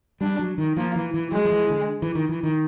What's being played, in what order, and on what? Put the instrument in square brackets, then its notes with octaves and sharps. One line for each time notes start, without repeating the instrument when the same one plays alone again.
[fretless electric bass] G3 [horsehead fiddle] D4
[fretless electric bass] F#3
D#3
[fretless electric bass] F3 [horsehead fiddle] A#3
[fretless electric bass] E3
E3
[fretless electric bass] F#3 [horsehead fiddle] G#3
[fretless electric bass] F3
E3
D3
E3
D#3
E3
D#3